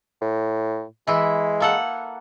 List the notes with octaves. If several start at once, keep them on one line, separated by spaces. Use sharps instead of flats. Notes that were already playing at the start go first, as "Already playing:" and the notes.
A2
E3 G#3 E4
A#3 A4 F#5